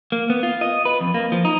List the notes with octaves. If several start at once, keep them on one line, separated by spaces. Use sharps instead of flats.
A#3
B3
F4
D#5
B4
F2
A#3
F3
D#4